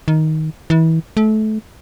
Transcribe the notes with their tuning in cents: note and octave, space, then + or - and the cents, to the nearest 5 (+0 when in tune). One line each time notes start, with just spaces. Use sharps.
D#3 +10
E3 -30
A3 -25